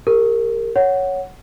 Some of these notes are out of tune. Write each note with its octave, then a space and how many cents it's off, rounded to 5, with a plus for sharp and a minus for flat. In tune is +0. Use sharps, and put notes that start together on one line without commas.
G4 +35 A#4 -15
C#5 +0 F#5 +0